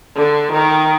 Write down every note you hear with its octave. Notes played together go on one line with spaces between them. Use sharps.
D3
D#3